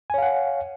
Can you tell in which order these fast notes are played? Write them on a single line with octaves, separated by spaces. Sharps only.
G#5 C#5 F5 F#5